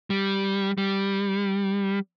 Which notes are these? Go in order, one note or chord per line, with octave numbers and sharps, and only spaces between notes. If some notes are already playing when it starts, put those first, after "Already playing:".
G3
G3